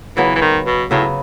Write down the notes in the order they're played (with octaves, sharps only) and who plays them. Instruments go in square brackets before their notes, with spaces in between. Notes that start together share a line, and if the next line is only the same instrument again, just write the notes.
[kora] C#3 F#3 B3 [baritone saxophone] E3
[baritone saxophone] E3
D#3
B2
[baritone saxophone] A2 [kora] C#3 F#3 B3